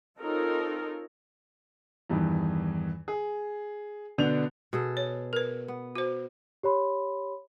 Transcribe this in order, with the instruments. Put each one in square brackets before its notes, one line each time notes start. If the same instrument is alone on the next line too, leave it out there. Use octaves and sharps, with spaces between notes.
[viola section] C4 D#4 F4 A4 A#4 C#5
[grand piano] E2 G2 D#3 E3
G#4
B2 D3 B3 D4 G6 F7
[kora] B2 G#4 A4
[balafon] C#5
A#4 B4
[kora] B3
[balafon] F#4 C5
[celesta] G4 C#5 B5 C6